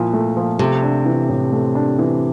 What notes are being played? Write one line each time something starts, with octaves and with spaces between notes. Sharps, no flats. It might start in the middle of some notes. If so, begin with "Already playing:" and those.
Already playing: A#2 F3 E4
A3
F3
C3 A3
D4
E3
A2
A3
D4
E3